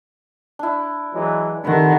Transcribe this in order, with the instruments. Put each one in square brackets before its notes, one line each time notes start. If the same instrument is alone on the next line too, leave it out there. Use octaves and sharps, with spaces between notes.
[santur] D4 E4
[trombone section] E3 F#3 G#3
[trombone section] C3 A3 [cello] D#3 [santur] B4 C5 F#5